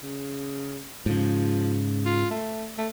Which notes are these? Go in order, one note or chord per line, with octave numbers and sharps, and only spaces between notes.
C#3
G#2 C#3 F3
F4
A3
A3